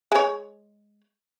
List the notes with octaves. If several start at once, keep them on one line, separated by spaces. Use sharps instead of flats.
G#3 C#5